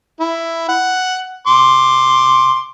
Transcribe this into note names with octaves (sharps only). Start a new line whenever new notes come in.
E4
F#5
C6 D6